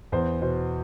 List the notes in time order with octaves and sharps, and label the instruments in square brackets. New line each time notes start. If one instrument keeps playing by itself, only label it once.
[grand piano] E2 C5
B2 C5